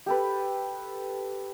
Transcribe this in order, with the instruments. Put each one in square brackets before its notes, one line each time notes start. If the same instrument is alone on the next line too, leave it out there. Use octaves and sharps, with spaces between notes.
[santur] G4 A4 B4